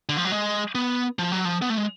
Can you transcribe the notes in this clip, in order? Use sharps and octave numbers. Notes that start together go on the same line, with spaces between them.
D3
F3
F#3
G#3
B3
F3
F#3
F3
B3
A3
G#3